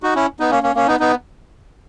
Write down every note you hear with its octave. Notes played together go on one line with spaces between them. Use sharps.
D#4 F#4
C#4 E4
B3 D#4
A#3 C#4
A#3 C#4
A#3 C#4
B3 D#4
B3 D#4